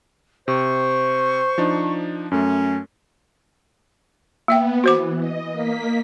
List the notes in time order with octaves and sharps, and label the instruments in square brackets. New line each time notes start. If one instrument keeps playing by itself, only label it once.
[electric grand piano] C3 [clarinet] C5 [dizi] C#6
[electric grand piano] F3 D4 D#4
[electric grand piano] F#2 A3 [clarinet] C#4
[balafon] A#3 E5 G5 [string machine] B3
[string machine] E3 [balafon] F#4 C5 D6
[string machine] D#5
A#3 B6